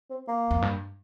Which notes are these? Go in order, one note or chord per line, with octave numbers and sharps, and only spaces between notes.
C4
A#3
F2
G2